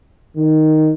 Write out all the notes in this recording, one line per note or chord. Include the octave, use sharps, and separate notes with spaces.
D#3